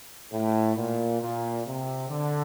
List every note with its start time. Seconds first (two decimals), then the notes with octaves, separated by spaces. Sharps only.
0.32 A2
0.77 A#2
1.21 A#2
1.66 C3
2.09 D3